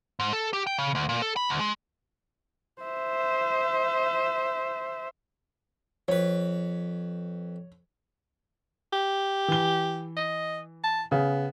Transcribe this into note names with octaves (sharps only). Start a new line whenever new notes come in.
G#2
A4
G4
G5
C#3
D2
A#2
A4
B5
D2
G#3
C5 E5
F2 B4 C#5
G4
E3 G7
D#5
A5
C#3 B3